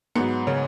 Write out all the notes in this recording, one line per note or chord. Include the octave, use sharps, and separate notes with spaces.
G#2 F#3 B3
C#3 C#4